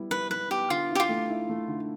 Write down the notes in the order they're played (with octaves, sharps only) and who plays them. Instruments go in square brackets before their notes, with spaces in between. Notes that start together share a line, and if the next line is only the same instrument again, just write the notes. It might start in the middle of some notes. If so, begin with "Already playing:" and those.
Already playing: [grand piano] G3 B3 E4
[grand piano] G3 [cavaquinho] B4
[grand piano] G3 [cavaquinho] B4
[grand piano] B3 [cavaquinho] G4
[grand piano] D3 [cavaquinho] F4
[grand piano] E4
[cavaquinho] G4
F4
[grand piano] A3
E4
A3
D3